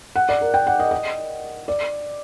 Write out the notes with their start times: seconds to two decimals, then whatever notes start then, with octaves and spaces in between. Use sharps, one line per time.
0.16 F#5
0.29 D5
0.41 A#4
0.54 G5
0.67 F#5
0.80 D#5
0.91 D#5
1.68 D5